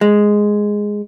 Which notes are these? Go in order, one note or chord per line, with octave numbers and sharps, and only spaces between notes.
G#3